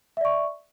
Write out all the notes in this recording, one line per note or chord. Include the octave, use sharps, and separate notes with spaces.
D5 E5 C#6